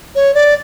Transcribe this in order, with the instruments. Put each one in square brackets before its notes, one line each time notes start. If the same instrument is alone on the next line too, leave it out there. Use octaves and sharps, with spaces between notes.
[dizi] C#5
D5